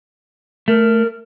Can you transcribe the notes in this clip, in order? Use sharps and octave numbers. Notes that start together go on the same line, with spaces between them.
A3 A#4